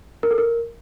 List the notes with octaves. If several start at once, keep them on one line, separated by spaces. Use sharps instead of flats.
A#4
A4
A#4